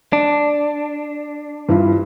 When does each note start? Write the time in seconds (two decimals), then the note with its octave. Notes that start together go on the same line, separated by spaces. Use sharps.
0.13 D4
1.69 G2 E4 F4